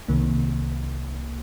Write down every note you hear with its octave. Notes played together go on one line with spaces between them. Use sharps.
C2 C3 D#3 A#3